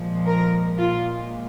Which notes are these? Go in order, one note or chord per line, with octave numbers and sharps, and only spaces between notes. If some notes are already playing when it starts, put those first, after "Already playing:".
Already playing: A#2 F3 G#3
A#4
A#2 G#3 F4